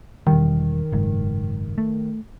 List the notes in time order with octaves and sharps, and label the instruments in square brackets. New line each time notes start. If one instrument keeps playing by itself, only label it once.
[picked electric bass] E1 G3 [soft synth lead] D#3
[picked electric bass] F#1 G#2
A3